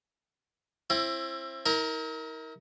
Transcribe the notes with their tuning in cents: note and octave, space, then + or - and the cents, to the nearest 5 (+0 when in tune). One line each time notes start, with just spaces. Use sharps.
C4 +30 E4 +30
E4 -45 A#4 +0